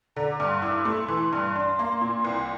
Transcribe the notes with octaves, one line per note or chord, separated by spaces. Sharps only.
D3 A#5
D6
G2
C6
E4 D6
D6
A3 C6
C6
E3 C6
G2
D4
A#3
A#2
C2